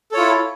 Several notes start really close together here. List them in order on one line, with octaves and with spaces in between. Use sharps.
A4 C#5 F4 E4